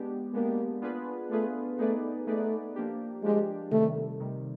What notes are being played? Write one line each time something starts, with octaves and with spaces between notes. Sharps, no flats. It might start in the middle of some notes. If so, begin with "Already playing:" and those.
Already playing: G#3 B3 D4 G4
G#3 A#3 B3 D4 G4
B3 D4 F4 G#4 B4
A3 B3 D4 F4 G#4 B4
A3 B3 D#4 G#4 B4 D5
A3 B3 D#4 G#4 B4 D5
F3 A#3 D4 G4
F3 G#3 A#3 D4 G4
C3 D#3 G3 A3
C3 D#3 G3